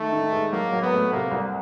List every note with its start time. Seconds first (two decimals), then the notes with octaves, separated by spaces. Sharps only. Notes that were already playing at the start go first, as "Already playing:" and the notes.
Already playing: D#3 A3
0.13 D#3
0.32 G#3
0.52 F#3 A#3
0.72 F#3
0.82 B3
0.92 A3
1.12 C3 A#3
1.32 C2